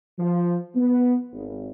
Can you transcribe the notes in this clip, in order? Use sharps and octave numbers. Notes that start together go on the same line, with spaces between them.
F3
B3
G#1